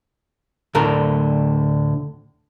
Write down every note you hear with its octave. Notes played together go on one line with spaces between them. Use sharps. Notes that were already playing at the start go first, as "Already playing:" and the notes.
D2 A2 D3 A#4